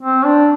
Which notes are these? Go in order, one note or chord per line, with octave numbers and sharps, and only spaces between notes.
C4
D4